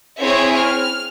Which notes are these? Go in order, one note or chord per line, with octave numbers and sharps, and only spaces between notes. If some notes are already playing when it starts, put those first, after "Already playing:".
C4 E4 G#4 C#5 E5
F6